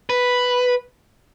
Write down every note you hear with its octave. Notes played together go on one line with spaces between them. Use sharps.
B4